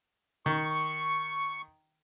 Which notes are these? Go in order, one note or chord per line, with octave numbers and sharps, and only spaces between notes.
D#3 C#6